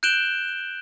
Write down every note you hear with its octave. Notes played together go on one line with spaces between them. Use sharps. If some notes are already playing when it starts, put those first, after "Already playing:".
F#6 G6 D7 E7 F#7 G7